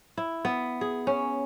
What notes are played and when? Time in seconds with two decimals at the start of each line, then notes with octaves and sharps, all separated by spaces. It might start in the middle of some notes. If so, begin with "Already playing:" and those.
0.18 E4
0.45 B3
0.81 G#4
1.07 C#4